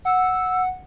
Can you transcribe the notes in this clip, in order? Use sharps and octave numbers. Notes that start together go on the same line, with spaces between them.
F#5 E6